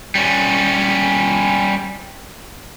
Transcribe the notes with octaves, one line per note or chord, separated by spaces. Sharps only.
G3 C#4